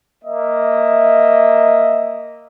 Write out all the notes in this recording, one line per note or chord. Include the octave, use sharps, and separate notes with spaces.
A#3 D#5 E5